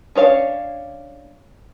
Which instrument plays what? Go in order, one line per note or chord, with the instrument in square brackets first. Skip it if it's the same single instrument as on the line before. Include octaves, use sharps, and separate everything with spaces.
[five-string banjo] C#4 D4 C#5 F5